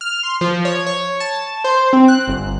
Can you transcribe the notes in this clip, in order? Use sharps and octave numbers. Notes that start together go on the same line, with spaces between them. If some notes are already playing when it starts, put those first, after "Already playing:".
F6
C6
F3
C#5
C#5
A5
C5
C4
F#6
G1